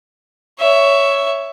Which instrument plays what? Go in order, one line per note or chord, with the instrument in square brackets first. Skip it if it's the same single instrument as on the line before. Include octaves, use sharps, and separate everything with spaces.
[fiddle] C#5 E5